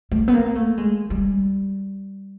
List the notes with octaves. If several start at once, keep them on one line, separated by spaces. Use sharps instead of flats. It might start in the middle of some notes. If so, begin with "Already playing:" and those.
A3
B3
A#3
A3
G#3
G3